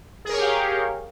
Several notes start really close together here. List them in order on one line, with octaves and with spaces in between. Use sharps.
G#4 A#4 C#5 G4 F5